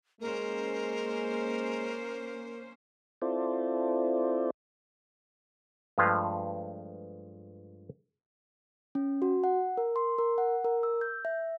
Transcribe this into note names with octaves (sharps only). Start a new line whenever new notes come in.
G#3 A#3 C#4 A#4 C5
C4 E4 F4 A4 C5 D5
G2 F3 G#3 A3 B4 F5
C#4
F#4
F#5
A#4
C6
A#4
F#5
A#4
E6
G6
E5